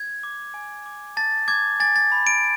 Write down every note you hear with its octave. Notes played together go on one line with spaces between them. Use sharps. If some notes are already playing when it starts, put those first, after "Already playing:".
Already playing: G#6
D6
G#5
D6
A5 A6
D6 G#6
G#5 A6
A6
B5
D7